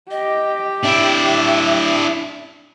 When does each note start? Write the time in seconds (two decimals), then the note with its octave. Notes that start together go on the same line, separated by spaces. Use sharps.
0.11 G4 D#5
0.84 D4 E4 E5